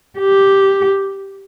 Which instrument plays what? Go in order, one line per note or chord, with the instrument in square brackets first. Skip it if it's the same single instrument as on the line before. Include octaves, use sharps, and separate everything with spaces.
[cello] G4